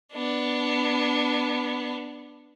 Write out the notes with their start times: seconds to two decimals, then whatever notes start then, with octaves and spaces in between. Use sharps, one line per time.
0.14 B3 D4